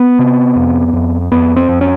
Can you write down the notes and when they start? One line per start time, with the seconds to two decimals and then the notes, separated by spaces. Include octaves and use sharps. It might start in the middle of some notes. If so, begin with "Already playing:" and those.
Already playing: B3
0.19 C3
0.56 F2
0.93 F2
1.32 F2 B3
1.56 C4
1.69 F2
1.81 C#4